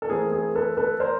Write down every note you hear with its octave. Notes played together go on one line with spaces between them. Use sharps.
A4
E3 A3 C4 G#4 A#4
G#4 A#4
A4 B4
A4 B4
A#4 C5